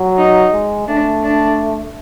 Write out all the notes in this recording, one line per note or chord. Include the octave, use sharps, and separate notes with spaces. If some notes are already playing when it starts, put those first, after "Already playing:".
Already playing: F#3
D#4
G#3
A3 D4
D4